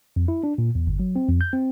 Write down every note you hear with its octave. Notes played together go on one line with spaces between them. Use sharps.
F2
E4
D4
A#2
E2
G1
F#3
C4
F2
G6
C4